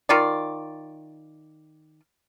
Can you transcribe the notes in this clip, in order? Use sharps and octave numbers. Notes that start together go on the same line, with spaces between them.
D#3 F4 D5